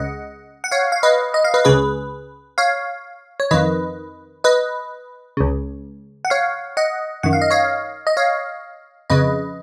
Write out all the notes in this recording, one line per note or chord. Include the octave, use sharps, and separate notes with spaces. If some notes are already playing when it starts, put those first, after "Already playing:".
Already playing: C#2 C#3 D#5 F#5
F#5
C#5 F5
F5
B4 D#5
D#5
F5
B4 D#5
C#2 C#3 G#4 B4
C#5 F5
C#5
F2 D#3 B4 D#5
B4 D#5
C#2 C#3
F#5
C#5 F5
D#5 F#5
F#2 D#3 F#5
F5
D#5
C#5 F5
D#5
C#5 F5
F2 C#3 B4 D#5